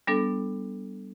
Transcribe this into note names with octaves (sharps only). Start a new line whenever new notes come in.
G3 B3 D4 A4